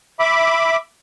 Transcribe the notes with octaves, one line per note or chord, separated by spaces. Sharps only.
E5 B5 D6